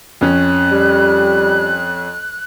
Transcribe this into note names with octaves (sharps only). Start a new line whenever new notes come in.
F2 C#4 F#6
G3